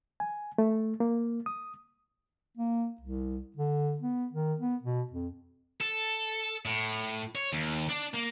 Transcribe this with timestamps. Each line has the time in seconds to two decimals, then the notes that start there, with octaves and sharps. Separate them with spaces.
0.20 G#5
0.58 A3
1.00 A#3
1.46 D#6
2.57 A#3
3.01 C2
3.56 D3
4.02 B3
4.32 D#3
4.60 B3
4.82 B2
5.13 F2
5.81 A4
6.65 A2
7.35 C#5
7.53 D#2
7.89 D4
8.14 A#3